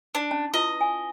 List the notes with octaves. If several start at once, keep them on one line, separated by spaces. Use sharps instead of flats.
D4 A5
C#4 A5
E4 F4 B4 D#5
G#5